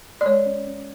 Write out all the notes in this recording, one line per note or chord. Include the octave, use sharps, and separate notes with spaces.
D5
G#3 C#5
C#4
C#4